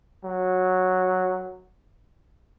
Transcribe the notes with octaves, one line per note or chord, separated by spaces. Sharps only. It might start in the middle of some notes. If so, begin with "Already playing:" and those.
F#3